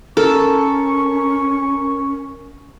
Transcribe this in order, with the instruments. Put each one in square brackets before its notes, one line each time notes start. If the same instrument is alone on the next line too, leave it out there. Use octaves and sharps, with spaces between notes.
[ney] C#4 [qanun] A4 [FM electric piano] A#4 [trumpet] C#6